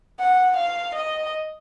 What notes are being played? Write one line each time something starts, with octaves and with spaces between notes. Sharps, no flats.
F#5
F5
D#5